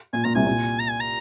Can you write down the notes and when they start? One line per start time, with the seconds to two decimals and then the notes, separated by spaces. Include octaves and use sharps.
0.13 A#2 G#5
0.24 A#2 A#5
0.35 C2 C3 G#5
0.46 A#2
0.80 A#5
0.90 G#5
1.00 A#5